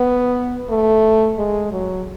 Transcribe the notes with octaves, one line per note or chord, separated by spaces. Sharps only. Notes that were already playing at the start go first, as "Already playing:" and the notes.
Already playing: B3
A3
G#3
F#3